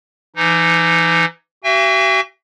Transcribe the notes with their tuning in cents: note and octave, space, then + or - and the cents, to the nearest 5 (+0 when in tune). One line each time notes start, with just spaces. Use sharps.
E3 +30 D#4 +0
F#4 +45 E5 +40 G#5 -45